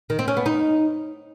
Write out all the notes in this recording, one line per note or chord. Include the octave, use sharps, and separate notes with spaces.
D#3
C4
C#4
B3
D#4